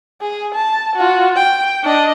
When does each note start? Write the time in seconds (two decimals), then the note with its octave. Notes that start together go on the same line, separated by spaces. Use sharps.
0.21 G#4
0.55 A5
0.96 F4 F#4
1.36 G5
1.84 D4 D#5